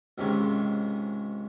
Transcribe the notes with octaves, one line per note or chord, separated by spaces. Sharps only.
C#2 G#2 C3 D#3 G#3